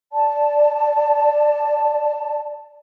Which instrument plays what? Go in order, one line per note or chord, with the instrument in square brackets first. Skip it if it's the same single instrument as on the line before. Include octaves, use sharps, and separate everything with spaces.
[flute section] D5 A5